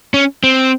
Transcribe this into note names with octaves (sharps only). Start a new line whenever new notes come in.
C#4
C4